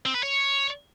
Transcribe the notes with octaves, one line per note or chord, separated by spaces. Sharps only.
C4
B4
C#5